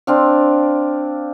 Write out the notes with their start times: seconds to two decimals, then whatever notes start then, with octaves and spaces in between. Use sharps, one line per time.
0.07 C4 D4 F5